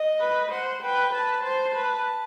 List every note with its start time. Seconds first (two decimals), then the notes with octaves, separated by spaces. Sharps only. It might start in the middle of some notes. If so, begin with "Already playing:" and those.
Already playing: D#5
0.21 B4
0.51 C5 F#5
0.82 B4 G5
1.13 B4 A5
1.44 C5 A5
1.75 B4